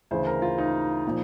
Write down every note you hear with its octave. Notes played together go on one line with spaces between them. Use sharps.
D2 C#3 E3 C5
A#4
F4
D#4
A#2 F3